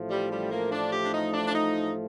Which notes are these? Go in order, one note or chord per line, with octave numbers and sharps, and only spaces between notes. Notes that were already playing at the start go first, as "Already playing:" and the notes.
Already playing: A1 A2 F3 A3
G3
G3
A#3
D4
G4
D4
D#4
D4
D4
D#4